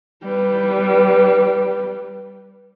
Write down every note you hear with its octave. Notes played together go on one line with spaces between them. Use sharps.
G3 B4